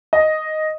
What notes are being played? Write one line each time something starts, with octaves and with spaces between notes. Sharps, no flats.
D#5